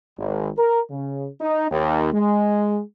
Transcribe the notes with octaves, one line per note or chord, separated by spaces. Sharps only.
G#1
A#4
C#3
D#4
D#2
G#3